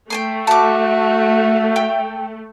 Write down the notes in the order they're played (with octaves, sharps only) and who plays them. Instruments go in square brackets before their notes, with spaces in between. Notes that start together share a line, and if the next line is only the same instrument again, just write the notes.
[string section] A3 [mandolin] G5 G#5 C6
[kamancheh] F#4 [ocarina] E5 [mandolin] A5 D6
[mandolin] G5